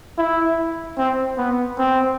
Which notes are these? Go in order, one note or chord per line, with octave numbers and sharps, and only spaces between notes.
E4
C4
B3
C4